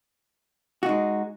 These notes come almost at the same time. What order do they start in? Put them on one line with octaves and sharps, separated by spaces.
F#4 D#4 G#3